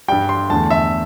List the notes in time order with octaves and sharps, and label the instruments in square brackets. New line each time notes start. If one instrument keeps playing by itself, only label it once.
[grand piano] G2 G3 G5
C6
E2 D3 A3 A5
E5